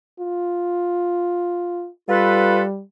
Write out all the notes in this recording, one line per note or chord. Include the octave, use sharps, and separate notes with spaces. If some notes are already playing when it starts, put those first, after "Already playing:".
F4
G3 F4 A4 B4